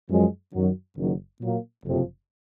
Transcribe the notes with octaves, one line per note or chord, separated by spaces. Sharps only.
F#2 F3 G#3
F#2 D#3 F#3
F#1 F#2 D#3 F#3
A#2 F#3 A#3
F#1 F2 C3 F3